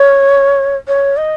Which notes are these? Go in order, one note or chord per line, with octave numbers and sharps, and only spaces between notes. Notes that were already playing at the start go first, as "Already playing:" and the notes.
Already playing: C#5
C#5
D#5